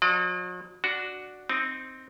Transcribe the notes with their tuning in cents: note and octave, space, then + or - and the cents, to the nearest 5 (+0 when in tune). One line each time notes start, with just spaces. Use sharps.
F#3 -45 D5 +45
D4 +0 F#4 +0
C4 +0 D#4 +0